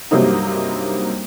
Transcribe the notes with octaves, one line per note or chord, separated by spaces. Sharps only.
G2 C3 F#3 A#3 C4 D#4